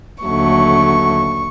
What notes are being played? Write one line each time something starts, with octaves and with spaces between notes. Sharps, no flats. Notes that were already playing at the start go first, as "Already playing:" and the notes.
D#2 D3 F#3 A3 C#6